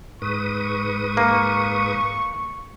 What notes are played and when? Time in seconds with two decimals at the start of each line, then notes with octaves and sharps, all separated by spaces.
0.22 G#2 B4 C#6 D#6
1.17 A#3